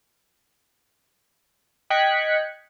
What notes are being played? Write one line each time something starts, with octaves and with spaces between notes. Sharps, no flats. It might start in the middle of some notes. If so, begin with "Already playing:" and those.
D#5 G5 F#6 G#6 B6 C#7